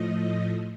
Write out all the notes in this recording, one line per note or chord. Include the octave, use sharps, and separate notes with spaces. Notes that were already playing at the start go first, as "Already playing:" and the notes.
Already playing: A2 F3 A3 D#5